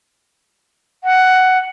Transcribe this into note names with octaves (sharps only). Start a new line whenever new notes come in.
F#5